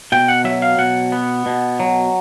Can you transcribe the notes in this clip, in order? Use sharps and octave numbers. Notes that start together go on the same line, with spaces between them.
B2 G5
F#5
F#3 E5
F5
B2 F#5
B3
B2
F#3